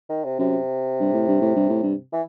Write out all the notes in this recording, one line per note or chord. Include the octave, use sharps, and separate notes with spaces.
D#3
C3
F#2 C3
G2
A2
G2
A2
G2
A2
G2
E3